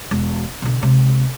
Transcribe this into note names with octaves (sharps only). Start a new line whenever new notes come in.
E1
B2 D3
C#2 C3